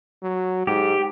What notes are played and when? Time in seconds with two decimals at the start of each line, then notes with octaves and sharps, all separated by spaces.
0.22 F#3
0.67 G#2 G4